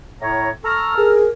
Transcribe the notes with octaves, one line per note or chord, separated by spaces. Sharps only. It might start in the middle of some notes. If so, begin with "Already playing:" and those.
A2 C#5 A#5
A4 A#5 C#6 F6
G#4 A#4